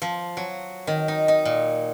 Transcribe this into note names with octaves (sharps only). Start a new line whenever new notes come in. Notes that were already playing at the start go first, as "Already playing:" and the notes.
F3
F#3
D#3
D#4
D#4
A#2